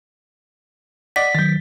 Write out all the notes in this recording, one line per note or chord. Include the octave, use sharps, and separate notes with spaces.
D5 D#5 F#5 B6
D#3 F#3 G6 A6